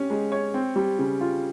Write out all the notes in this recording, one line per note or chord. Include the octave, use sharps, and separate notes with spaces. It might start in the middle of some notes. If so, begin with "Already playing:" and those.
Already playing: C#4 G4
G#3
C#5
C4
G3
C#3
F4